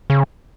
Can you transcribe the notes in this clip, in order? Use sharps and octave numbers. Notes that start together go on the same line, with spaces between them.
C#3